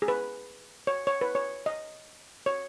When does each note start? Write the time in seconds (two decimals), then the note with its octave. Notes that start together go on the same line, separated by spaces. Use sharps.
0.02 G#4
0.08 B4
0.87 C#5
1.07 C#5
1.21 B4
1.35 C#5
1.66 D#5
2.46 C#5